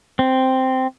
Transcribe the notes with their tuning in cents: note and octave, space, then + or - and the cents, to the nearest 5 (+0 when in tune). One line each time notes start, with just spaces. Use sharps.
C4 -5